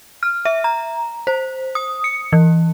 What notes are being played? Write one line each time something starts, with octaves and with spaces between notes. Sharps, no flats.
F6
E5
A#5
C5
D#6
C#7
E3